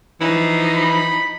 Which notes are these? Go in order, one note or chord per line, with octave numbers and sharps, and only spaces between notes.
E3 F3 D#4
B5